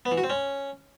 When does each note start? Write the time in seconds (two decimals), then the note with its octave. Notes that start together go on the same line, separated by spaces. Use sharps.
0.06 B3
0.12 E3
0.18 F#4
0.24 C4
0.30 C#4